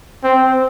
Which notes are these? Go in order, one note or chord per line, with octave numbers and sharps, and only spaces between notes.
C4